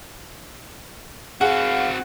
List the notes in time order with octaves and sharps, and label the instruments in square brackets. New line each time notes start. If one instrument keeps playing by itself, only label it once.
[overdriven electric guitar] C4 F#4 [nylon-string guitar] G#4 [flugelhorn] F5 [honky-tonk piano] F#5